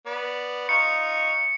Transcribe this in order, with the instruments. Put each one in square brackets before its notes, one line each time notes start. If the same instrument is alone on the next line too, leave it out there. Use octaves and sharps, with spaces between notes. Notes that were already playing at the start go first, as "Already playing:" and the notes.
[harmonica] B3 D5
[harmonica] D#4 F4 C#6 [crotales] C#7